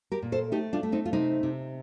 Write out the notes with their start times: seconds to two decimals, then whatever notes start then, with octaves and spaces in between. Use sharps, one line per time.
0.12 G4 A#4
0.22 A#2
0.32 A4 C5
0.52 A3 D#4 G4
0.73 D4 F4
0.83 A3
0.92 C4 D#4
1.06 F4
1.13 C3 C4 D#4
1.43 C3